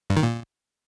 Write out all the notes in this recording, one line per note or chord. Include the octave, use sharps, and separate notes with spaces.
G2
D#3
A#2